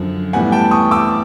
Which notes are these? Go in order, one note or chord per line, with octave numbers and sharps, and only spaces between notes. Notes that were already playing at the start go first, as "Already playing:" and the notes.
Already playing: F#2 D3 F3
A2 E3 G3 B3 F#5 G#5
G5 A5
C#6 D#6
D6 E6